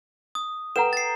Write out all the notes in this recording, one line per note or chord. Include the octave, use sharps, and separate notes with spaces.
D#6
A4 B4 F#5 G5 A#5 E7
A6 C7